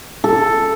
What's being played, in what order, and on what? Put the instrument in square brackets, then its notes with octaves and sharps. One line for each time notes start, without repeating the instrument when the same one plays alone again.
[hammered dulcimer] A4